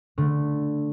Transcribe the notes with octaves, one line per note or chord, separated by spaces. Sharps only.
D3 A3